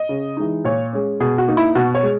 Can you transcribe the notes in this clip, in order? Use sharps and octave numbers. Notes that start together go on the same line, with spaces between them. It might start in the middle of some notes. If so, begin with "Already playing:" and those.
Already playing: D#5
C#3
E3 G#3 D#4
A#2 C#5
G#3 C#4
B2 G#4
F#4
A#3 D#4
E4
B2 F#4
C#5
G#3